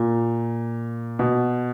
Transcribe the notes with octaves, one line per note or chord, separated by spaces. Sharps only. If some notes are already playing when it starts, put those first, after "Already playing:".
Already playing: A#2
B2